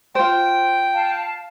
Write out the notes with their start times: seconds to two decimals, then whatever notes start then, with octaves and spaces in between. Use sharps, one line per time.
0.15 F4 C5 G5
0.93 F5 A5